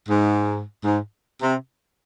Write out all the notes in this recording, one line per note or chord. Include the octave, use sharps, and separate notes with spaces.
G#2
G#2
C3